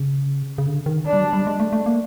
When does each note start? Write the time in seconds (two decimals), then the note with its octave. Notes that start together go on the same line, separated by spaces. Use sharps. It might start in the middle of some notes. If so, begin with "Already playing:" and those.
Already playing: C#3
0.58 C#3
0.67 D3
0.86 D#3
1.06 D4
1.13 G3
1.20 F#3
1.33 G3
1.47 G#3
1.60 A3
1.73 A3
1.86 A#3